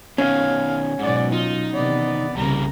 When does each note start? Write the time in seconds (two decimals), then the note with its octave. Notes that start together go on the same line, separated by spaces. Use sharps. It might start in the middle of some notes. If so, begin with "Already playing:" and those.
0.18 B2 D#3 C#4 F5
0.99 G#2 B2 F#3 D5 F#5
1.32 D#4 F4
1.73 C3 D#3 E3 B3 D5
2.38 C2 C#3 G3 A#3 A#5